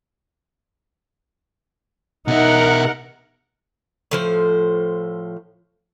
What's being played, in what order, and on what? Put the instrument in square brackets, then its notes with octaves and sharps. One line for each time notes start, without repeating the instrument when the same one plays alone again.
[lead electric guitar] B2 E5 [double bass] D#4 [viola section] A#4 F#5
[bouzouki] A2 F3 C5